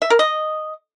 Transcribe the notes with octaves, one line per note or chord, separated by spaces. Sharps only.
E5
A#4
D#5